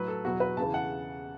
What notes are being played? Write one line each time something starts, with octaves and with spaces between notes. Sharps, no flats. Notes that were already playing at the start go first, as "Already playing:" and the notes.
Already playing: A2 F#3 B4
A4
E2 B2 F#3 F#4
B4
E2 C#3 E3 A5
F#5